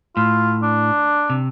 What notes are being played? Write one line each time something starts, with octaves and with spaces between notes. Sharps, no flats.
A2 F4
D4
C3